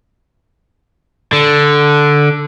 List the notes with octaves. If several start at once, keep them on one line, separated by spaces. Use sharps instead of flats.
D3